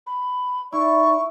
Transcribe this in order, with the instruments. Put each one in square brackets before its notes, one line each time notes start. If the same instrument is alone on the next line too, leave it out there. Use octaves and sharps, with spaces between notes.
[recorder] B5
[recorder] D#4 [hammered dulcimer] E4 [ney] D5 [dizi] C#6